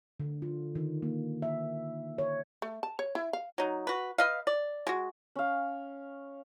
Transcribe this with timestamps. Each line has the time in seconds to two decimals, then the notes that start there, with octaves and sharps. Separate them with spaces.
0.20 D3
0.42 F4
0.75 D#3
1.02 A#3
1.42 E5
2.18 C#5
2.62 A3
2.83 A5
2.99 C#5
3.15 E4
3.33 F5
3.58 F#3 D#4
3.87 F#4 B4
4.18 B4 D#5 F5
4.47 D5
4.87 G#3 F#4
5.36 C#4 F5